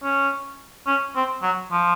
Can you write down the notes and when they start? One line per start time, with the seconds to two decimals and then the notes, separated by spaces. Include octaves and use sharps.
0.04 C#4
0.87 C#4
1.16 C4
1.43 F#3
1.72 F3